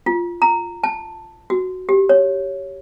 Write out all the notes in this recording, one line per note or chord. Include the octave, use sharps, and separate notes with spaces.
F4
A#5
A5
F#4
G4
C#5